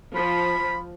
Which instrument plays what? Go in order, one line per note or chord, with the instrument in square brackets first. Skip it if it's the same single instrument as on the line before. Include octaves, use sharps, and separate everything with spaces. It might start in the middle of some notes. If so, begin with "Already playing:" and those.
[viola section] F3 [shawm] B5